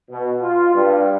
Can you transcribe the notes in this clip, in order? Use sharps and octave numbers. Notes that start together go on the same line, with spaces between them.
B2
F4
G2